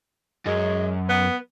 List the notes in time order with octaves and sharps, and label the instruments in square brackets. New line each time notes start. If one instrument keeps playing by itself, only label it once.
[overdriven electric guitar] F#2 [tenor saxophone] G#3
[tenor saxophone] B3